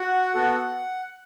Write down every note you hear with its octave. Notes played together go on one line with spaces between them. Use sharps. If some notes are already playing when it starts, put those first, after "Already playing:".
Already playing: F#4 F#5
B3 F#4 A4